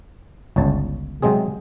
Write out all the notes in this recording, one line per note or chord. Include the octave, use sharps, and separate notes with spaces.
G1 C#2 C#5 A5
C3 F#3 G#3 C4 G#4